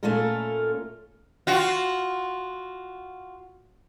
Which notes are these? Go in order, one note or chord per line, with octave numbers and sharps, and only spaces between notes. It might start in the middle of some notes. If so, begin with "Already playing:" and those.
A#2 A3 C#4 F4 A4 A#4
F4 F#4